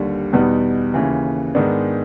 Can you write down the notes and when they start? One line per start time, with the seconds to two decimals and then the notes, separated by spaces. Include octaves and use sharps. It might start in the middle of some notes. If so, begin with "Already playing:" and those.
Already playing: D#2 D3 G3
0.33 E2 B2 G3 B3 D#4
0.94 D#2 C#3 E3
1.55 G#2 D#3 G#3 B3 D4